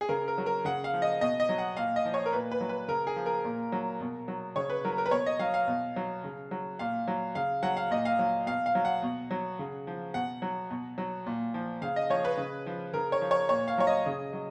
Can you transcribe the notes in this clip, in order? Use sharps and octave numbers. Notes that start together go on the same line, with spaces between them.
G#4
C#3 A#4
A#4
F#3
A#4
C#3 F#5
F5
F3
D#5
B2 D#5
D#5
F#3
F#5
A#2 F5
D#5
F3
C#5
A#4
A#2 B4
B4
F#3
B4
C#3 A#4
G#4
F3
A#4
A#2
F#3
B2
F#3
C#3 C#5
B4
F#3 A#4
A#4
B4
B2 C#5
D#5
F#3 F5
F5
B2
F#3
C#3
F#3
A#2 F5
F#3
C#3 F5
F#3 F#5
F5
A#2 D#5
F5
F#3
B2 F5
F5
F#3
F#5
B2
F#3
C#3
F3
B2 F#5
F#3
B2
F#3
A#2
F3
C#3 F5
D#5
F3 C#5
B4
C#3
F3
C#3 A#4
C#5
F3
C#5
A#2 C#5
F5
F#3 C#5
D#5
C#3
F#3